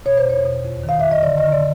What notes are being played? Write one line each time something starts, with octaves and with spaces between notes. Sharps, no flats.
B2 C#5
C5
E2 C#5
B2
F2
D#3
F5
F2 E5
D#5
D3 D5
D#5
D3
D5